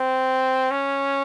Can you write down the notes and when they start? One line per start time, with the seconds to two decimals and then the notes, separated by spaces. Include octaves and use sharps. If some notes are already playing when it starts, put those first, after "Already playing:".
Already playing: C4
0.71 C#4